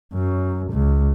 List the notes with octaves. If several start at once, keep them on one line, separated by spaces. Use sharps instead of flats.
F#2
C#2